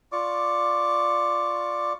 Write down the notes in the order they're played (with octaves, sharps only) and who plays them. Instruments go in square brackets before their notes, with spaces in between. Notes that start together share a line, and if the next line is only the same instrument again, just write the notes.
[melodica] F4 D5 C#6 D6